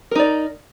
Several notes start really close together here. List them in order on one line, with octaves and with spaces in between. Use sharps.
A#4 D#4 D5